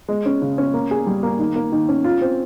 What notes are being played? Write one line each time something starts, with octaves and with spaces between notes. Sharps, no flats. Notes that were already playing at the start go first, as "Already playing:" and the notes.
G#3
C#4
C#3
C#4
A#3
G#4
G3
A#3
D#3
A#3
D#3
C#4
F4
C4